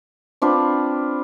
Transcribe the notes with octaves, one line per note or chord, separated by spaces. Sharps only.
C4 D4 F4 B4